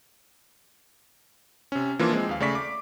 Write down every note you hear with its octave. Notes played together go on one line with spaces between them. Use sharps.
C3 C#4
E3 F3 A#3 D4 E4 F4
G#3 C4
D#2 F5
C#3 A3 D5 C#6 B6
D6